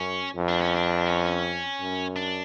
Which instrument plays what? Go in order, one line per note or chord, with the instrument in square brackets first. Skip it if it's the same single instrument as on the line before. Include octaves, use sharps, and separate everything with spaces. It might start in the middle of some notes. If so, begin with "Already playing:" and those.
Already playing: [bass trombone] F#2 [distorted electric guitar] C#4
[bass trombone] F2
[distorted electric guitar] D4
C#4
D4
C#4
[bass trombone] F#2
[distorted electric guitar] D4